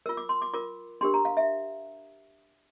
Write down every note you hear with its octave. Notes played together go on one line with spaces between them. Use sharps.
F4 A#4 E6
D6
C6
D6
F4 A#4 D6
D4 G4 A#4 C6
A#5
F5
E5